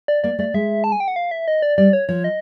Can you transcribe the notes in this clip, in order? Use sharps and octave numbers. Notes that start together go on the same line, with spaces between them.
D5
A#3 D5
A3 D5
G#3 E5
A5
G#5
G5
F#5
F5
E5
D#5
D5
G3 D5
C#5
F3 C#5
D#5